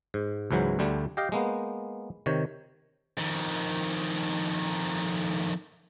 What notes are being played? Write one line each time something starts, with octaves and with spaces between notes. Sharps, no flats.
G#2
C#2 G#2 E3 F#3
D2 D3 G3 A3
G4 D#5 F5 G5
G#3 A#3 B3
C3 D#3 C#5
F2 D#3